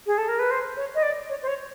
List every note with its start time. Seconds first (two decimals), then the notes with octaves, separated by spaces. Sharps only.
0.06 G#4
0.18 A4
0.28 A#4
0.39 B4
0.51 C5
0.77 C#5
0.95 D#5
1.03 D5
1.29 C#5
1.42 C5
1.48 C#5